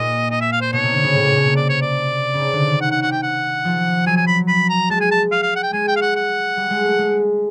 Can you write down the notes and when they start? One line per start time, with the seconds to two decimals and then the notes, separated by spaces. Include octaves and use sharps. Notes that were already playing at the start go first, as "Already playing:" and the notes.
Already playing: A#2 D#5
0.31 D#5
0.41 E5
0.52 F5
0.61 C5
0.73 B2 C#5
0.83 C3
0.93 D3
1.04 C#3
1.14 A2
1.24 A#2
1.35 B2
1.45 C3
1.56 D5
1.69 C#5
1.82 D5
2.34 C#3
2.39 C3
2.53 D3
2.67 D#3
2.81 F#5
2.91 F#5
3.02 F#5
3.12 G5
3.23 F#5
3.65 F3
4.06 F#3 G#5
4.17 G#5
4.27 B5
4.48 B5
4.70 A#5
4.90 G#3 A5
5.01 G#5
5.11 A5
5.32 F5
5.43 F5
5.56 F#5
5.63 G5
5.73 G#3 G#5
5.88 G5
5.96 F5
6.01 F#5
6.16 F#5
6.57 G3
6.70 G#3
6.85 A3
6.99 G#3